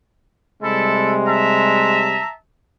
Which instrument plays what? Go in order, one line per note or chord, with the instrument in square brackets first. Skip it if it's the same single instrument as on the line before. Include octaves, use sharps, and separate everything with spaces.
[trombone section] C3 G3 G#3 [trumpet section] E4 A4
[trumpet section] E5 A5 A#5